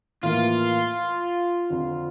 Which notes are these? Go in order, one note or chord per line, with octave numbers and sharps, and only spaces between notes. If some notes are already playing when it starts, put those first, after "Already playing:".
A2 E3 A#3 F4
F2 D3 F3